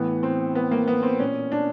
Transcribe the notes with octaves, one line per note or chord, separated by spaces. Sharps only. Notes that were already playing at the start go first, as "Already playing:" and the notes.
Already playing: A2 E3 B3
C4
B3
A#3
B3
C4
A#2 C#4
D4